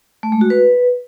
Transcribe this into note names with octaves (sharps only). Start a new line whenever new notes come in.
A3
G#3
F#4
B4